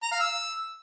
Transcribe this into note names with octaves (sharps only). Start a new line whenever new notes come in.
A#5
F5
E6